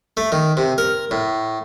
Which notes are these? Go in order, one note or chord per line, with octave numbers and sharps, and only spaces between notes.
A3
D#3
C3
A#4
A2